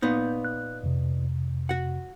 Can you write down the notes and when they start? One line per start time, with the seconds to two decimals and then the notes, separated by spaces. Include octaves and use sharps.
0.02 A#2 B3 D#4 G6
0.45 F#6
0.83 F2 C3
1.69 F#4 F#5